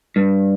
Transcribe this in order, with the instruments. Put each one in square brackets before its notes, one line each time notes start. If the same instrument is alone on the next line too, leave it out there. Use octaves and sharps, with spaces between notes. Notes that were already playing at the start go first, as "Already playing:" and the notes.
[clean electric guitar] G2